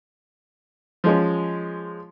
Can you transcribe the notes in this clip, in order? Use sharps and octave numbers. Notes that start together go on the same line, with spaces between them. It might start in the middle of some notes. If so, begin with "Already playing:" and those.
F3 G#3 C#4